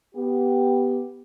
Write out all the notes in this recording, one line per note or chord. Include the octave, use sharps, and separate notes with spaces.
B3 G4